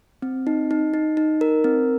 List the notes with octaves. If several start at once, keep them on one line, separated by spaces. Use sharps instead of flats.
C4
D#4
D#4
D#4
D#4
A#4
C4